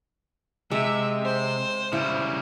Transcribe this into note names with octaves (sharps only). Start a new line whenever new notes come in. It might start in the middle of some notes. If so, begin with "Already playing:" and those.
C3 G#3 E5
C5
C#3 G3 E4